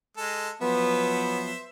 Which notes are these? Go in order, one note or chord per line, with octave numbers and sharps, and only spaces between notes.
G#3 A4
F3 F#3 B3 B4 C5 E5